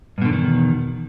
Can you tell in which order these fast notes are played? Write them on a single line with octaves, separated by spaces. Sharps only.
G2 B2 D3 E2 D#3